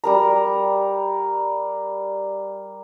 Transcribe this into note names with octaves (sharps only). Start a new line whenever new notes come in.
G3 A#4 A#5